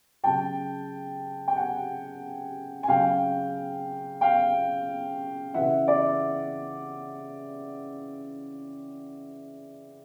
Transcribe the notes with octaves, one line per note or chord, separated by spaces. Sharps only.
C#3 F#3 G5 A5
G5
F#5 G#5
G#5
C#3 F#3 F5 G5
F5 G5
C#3 E3 E5 F#5
D5 E5